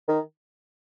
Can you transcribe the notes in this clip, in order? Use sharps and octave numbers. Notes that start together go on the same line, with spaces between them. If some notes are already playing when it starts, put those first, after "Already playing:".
D#3